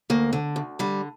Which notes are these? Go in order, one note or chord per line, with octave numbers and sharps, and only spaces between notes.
D2 A#3
D3
D2
D3 G3